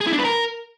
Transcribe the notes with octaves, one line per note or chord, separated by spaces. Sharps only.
G#4
E4
D4
B4
A#4